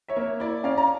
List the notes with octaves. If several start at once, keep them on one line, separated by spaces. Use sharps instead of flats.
C#5 E5
A#3
E4 D5
C#4 D5 F5
A#5